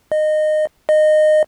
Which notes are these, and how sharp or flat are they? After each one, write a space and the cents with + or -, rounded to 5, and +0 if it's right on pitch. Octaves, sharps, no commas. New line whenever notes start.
D#5 -20
D#5 -20